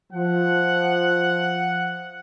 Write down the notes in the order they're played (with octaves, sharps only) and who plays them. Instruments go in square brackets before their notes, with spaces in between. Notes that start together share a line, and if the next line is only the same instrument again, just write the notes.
[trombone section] F3 [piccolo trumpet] F#5